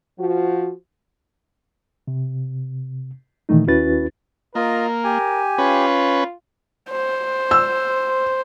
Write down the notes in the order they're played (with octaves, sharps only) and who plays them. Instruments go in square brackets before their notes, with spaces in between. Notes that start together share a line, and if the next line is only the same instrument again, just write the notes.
[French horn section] F3 F#4
[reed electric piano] C3
A#2 D#3 E3 A3 D#4
D#2 C#4 E4 F#4 B4 A6
[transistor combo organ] A#3 [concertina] F4 D#5 [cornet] A#4
[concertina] G4 G#5
[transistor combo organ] C#4 B4 [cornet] F4
[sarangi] C5
[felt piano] E6